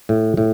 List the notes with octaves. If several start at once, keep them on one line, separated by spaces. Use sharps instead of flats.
A2
A2